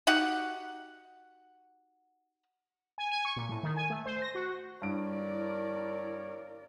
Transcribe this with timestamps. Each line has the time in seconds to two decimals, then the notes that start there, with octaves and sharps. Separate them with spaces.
0.07 D#4 F#4 G4 F#5
2.98 G#5
3.12 G#5
3.25 C#6
3.36 A#2
3.49 A2
3.63 D#3
3.76 G#5
3.90 A3
4.06 C5
4.22 A#6
4.35 F#4
4.82 G2 E4 A#4 C#5 D5 D7